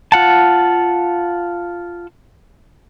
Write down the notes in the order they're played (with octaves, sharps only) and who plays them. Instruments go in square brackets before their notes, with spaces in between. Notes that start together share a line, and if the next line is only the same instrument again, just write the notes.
[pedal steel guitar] F4 F#5 A5